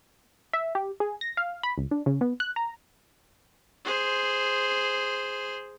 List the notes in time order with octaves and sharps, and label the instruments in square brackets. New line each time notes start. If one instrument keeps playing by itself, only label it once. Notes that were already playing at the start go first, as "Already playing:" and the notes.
[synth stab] E5
G4
G#4
A#6
F5
B5
C#2
D4
C#3
B3
F#6
A#5
[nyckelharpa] G#4 C5